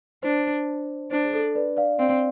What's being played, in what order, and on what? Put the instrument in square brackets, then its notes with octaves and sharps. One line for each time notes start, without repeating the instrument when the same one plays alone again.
[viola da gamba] D4 [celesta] C5
[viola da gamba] D4 [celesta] C5
[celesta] G#4
A4
B4 D5
D5 F5
[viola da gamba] C4 [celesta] D5 F5